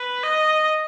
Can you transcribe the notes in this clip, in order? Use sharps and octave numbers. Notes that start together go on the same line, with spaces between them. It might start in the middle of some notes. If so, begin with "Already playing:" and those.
Already playing: B4
D#5